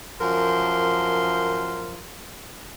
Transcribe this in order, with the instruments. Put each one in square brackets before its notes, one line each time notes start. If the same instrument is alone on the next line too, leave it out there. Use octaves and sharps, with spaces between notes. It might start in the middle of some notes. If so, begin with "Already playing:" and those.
[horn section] F#2 F3 A#4 C6